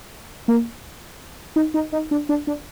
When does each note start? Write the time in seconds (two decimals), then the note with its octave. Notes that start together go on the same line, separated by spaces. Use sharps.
0.48 A#3
1.56 D#4
1.74 D#4
1.92 D#4
2.11 D4
2.29 D4
2.47 D4